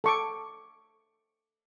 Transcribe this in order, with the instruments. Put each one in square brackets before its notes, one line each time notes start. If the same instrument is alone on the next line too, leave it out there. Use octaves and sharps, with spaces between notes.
[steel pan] A4 C#6 D6